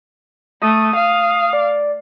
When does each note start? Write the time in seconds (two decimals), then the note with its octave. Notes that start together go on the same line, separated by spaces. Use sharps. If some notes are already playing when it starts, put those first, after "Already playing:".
0.62 A3 D#6
0.96 F5
1.53 D5